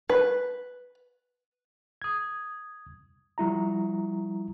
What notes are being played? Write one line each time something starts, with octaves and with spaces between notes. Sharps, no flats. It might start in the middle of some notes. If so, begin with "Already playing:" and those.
B4
D#6 G#6
F3 G3 E4 A#5